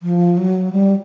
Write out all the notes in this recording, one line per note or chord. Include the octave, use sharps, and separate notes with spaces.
F3
F#3
G3